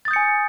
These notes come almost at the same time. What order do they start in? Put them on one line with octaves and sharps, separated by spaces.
A6 D#6 G6 C#7 G#5